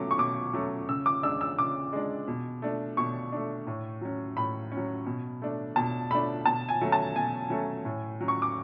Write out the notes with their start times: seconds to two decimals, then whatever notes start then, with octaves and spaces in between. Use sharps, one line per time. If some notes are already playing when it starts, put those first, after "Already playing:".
Already playing: B2 F#3 A3 C#4 D6
0.11 C#6
0.18 B2 D6
0.53 F#3 A3 C#4
0.89 C#3 E6
1.06 D6
1.22 G#3 D4 E6
1.41 E6
1.59 C#3 D6
1.93 G#3 D4
2.28 B2
2.62 A3 D4
2.97 B2 C#6
3.32 A3 D4
3.67 A2
4.01 F#3 C#4
4.37 A2 B5
4.72 C#4
4.77 F#3
5.07 B2
5.42 A3 D4
5.76 B2 A5
6.11 A3 D4 B5
6.46 B2 A5
6.69 G#5
6.81 F#3 A3 C#4
6.92 A5
7.16 B2 G#5
7.50 F#3 A3 C#4
7.85 A2
8.21 F#3 C#4
8.28 C#6
8.42 D6